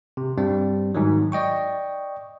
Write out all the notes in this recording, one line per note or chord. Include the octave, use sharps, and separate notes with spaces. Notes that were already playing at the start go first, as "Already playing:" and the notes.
C3
G2 G3 C4
G#2 D#3 F#3
D5 D#5 G5 C#6